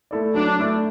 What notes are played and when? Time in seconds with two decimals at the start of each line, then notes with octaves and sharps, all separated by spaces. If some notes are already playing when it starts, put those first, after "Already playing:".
0.11 A3 E4 A4 D5
0.35 F#3 D4
0.59 A3 E4 A4 D5